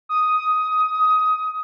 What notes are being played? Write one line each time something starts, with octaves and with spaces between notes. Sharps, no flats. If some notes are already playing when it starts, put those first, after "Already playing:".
D#6